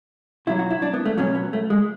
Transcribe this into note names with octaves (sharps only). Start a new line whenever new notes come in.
B2 F#3 E4
F#4
E4
D4
B3
A3
B2 F#3 C#4
B3
A3
G#3